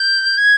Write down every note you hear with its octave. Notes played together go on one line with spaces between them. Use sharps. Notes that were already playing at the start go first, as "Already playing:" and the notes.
Already playing: G6
G#6